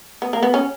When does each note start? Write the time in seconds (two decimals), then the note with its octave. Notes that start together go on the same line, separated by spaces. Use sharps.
0.22 B3
0.33 A#3
0.43 B3
0.54 C#4